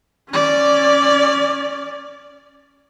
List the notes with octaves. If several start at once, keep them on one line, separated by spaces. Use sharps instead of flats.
C#4 D5